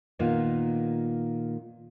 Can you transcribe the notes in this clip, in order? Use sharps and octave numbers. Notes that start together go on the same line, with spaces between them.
A#2 D#3 A#3 B3